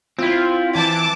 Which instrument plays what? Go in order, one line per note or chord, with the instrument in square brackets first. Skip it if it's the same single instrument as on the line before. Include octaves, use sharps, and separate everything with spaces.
[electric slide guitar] C4 E4 [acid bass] F4
[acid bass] E3 [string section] A5 D6